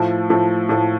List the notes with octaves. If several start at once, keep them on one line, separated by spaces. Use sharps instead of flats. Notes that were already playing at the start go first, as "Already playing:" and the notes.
Already playing: A2 F3 A3
A2 F3 A3
A2 F3 A3